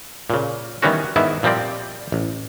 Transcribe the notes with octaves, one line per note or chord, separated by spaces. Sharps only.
A#2 C#3
D#3 E3 G3 B3 C#4 F#4
G#2 D#3 B3 E4 E5
A#2 F3 G3 C4 D5
A1